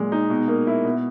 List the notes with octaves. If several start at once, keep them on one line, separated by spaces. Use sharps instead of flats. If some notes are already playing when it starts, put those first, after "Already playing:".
Already playing: A#2 G#3
D#4
B2
A#3
E4
B2